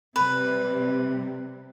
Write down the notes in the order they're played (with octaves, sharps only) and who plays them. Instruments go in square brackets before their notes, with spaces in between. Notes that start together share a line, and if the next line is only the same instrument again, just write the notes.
[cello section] C3 G3 [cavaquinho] B4